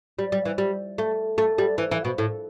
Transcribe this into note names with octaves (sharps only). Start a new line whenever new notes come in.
G3
G3
E3
G3
A3
A3
G3
E3
E3
B2
A2